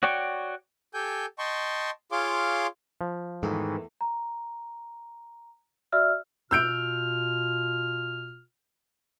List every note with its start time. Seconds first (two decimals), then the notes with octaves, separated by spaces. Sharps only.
0.03 F#4 C#5 D5 G5 C#6
0.94 G4 A4 G5 G#5 G6
1.39 D#5 G5 A5 C6 C#6
2.12 F4 G#4 C#5 F5 C6 D6
3.01 F3
3.43 E2 G#2 D#3 E3 A3
4.01 A#5
5.92 F#4 D5 E5 E6 F6
6.51 B2 F4 E6 F6 G6 D7